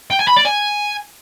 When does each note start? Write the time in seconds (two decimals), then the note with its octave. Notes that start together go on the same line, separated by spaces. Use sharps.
0.11 G5
0.19 G#5
0.28 B5
0.37 D5
0.46 G#5